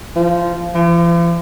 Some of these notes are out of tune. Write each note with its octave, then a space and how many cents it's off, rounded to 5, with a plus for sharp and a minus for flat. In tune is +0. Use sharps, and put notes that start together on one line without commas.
F3 -15
F3 -45